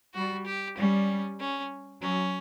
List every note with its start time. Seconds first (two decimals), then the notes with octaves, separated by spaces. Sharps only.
0.14 G3 F#4
0.46 G4
0.77 G3 C#4
1.40 C#4
2.01 F#3 C#4